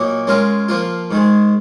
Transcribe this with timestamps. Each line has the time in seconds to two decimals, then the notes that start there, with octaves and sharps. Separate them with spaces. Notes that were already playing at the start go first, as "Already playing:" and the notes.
Already playing: A#2 F#3 A#3 D#4
0.27 G#3 C#4 F4 A#4
0.68 F3 A#3 F4
1.11 G#2 D#3 G#3